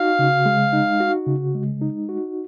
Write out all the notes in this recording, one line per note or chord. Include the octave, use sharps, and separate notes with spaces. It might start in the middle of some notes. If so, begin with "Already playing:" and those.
Already playing: D#4 F#4 F5
C#3
G#3
D#4
F#4
C#3
G#3
D#4
F#4